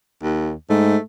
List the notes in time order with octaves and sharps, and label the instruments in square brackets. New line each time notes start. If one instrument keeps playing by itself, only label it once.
[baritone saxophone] D#2
[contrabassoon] G#2 [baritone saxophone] A3